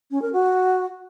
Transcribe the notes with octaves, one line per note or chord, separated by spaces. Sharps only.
C#4
A#4
F#4